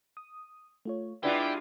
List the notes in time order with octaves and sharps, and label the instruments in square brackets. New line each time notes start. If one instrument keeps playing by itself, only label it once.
[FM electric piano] D#6
A3 F4 C#5
[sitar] G#3 D4 F4 [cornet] E4 [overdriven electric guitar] G4 [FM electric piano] B4 D5 F#5